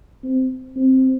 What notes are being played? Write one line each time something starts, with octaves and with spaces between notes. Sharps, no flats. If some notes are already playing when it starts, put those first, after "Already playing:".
C4
C4